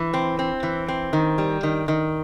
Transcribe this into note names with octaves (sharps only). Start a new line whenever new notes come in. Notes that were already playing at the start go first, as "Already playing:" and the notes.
Already playing: E3
C4
C4
E3
C4
D#3
G3
D#3
D#3